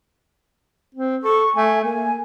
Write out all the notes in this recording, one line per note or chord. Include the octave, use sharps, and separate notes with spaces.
C4
A4 C#6
A3 G#5
A#3 G#5